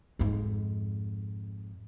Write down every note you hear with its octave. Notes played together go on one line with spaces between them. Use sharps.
F2 G#2